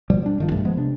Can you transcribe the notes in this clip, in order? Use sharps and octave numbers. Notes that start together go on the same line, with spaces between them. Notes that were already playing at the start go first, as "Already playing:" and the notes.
B2 F3 G3
G3 D4
G1 D#3 F3
B1 G2 A3
F3 G#3 B3
C3 D4